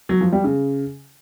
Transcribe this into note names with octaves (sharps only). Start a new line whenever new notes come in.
F#3
F3
G3
C#3